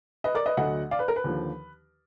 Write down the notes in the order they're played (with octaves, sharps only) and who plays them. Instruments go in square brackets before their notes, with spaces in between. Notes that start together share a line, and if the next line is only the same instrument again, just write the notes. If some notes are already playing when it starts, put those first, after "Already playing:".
[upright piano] B4 D#5
A#4 D5
B4 D#5
D2 D3 F#3 D#5 F#5
D5 F5
B4
A#4
B4
D#2 D3 F3